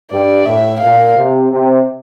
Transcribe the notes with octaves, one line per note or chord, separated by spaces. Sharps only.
G2 D5
A2 E5
A#2 F5
C3
C3